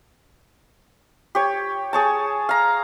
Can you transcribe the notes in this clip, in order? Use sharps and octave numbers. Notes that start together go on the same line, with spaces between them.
G4 C#5
G#4 C#5 A5
F5 A#5